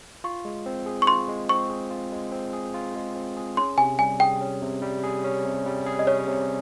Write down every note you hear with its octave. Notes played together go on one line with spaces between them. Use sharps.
F4 C#6
G#3
C4
G#4
C#6
F4 C6
G#3
C4 C#6
G#4
F4
G#3
C4
G#4
F4
G#3
C4
G#4
C#4 C6
C3 G#5
G3 G#5
G#4 G5
C#4
C3
G3
G#4
C#4
C3
G3
G#4
D#5
C#4 C#5
C3